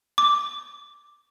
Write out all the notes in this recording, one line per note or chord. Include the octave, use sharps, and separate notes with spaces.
D6